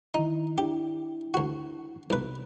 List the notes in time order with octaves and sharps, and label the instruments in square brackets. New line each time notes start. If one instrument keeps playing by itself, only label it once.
[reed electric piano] D#3 E4 [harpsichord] D#4
[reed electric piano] D4 E4 [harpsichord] G4
[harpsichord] D2 F#4
[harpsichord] B1 B4 [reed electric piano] C3